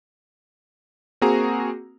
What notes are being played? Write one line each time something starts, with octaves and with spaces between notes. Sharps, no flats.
A#3 C4 F#4 G#4 A#5